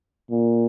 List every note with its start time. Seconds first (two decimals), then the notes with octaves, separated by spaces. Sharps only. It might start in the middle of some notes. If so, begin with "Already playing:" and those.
0.30 A#2